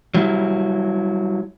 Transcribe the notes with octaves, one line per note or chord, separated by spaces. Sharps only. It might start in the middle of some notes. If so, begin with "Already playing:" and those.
F#3 G3 E4